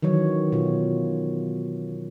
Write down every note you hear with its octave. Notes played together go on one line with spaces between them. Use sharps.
D#3 E3 F#3 C#5
B2 F4